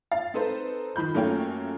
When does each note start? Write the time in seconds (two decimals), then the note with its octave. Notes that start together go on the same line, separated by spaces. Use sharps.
0.11 F5 A6
0.34 C4 D#4 A4 B4 C5
0.96 D#3 F3 B5 G6
1.14 F#2 A3 A#3 C#4 F4 G5